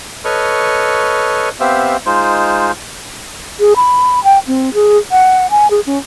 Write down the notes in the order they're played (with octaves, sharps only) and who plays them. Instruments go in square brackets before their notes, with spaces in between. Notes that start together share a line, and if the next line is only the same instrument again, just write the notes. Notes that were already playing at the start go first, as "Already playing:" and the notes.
[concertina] A4 B4 C#5 D#5 C#6 F6
B3 C4 G4 C5 E5 F5
G#3 D#4 F4 C5
[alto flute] G#4
B5
G5
C4
G#4
F#5
G#5
G#4
C#4